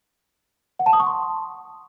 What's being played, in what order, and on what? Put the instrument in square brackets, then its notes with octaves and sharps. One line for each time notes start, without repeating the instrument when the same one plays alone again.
[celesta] F#5
A5
D#6
C#6
C6